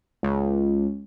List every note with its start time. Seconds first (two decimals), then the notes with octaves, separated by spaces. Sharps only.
0.23 C#2